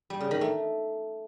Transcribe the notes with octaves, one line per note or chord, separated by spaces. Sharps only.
G3
C#3
D#3
A3